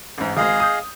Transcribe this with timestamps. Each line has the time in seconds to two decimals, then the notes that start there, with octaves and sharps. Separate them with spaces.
0.18 A1 G#2
0.37 G#1 G#3 G#4 D#5 F5
0.60 D#6 G6